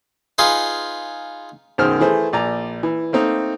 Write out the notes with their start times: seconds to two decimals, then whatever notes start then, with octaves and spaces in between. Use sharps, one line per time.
0.38 D#4 F4 G#4 B4
1.78 B1 F#2 D#3 G#4 C5 F6
2.00 E3 A3 G#4 C5
2.33 A#1 D5 G#5 A#5
2.83 E3
3.13 A3 A#3 C4 D#4